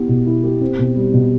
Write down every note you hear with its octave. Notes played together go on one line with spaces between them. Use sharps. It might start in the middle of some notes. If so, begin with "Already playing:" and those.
Already playing: B3 E4 G4
B2
E4
G4
C4
B2
G3
B2